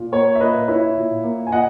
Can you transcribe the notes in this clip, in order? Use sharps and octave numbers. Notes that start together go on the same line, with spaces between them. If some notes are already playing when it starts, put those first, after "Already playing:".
Already playing: A#2
A#3 C#5
E5
A#2 B4 D#5
E4 C#5 E5
A#2
A#3
G#5
A#2 D#5 F#5